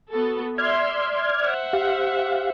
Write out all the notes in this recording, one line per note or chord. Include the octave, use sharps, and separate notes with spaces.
B3 F#4 A4
D5 E5 C6 F6 G#6
C5 E5 F#5
G4 F5